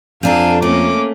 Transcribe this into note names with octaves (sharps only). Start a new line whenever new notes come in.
F2 C4 D4 A4 F5 G#5 A#5
A3 A#3 C#4 D6